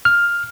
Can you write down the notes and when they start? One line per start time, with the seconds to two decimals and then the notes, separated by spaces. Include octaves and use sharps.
0.05 F6